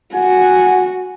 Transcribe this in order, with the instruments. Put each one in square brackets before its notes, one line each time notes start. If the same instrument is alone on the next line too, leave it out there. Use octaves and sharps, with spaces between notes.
[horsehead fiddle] F#4 [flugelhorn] F#5 [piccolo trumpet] G#5